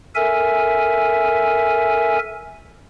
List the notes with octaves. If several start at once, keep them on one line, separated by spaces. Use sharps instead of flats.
A4 A#4 E5 G#5